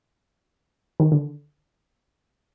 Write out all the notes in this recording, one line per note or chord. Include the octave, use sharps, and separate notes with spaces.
D#3
D3